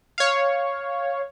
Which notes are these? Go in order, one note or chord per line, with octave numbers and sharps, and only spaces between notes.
C#5 F5